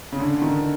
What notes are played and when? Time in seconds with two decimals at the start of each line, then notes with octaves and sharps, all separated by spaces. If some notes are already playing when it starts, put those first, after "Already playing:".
0.12 C#3
0.20 D3
0.42 D#3